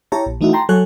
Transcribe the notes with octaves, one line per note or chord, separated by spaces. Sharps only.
E4 G4 C#5 A5 A#5
A#1
E3 A3 D#4 E4 F#4
G5 A5 A#5 C6
F#3 A4 C#5 G#5 F#6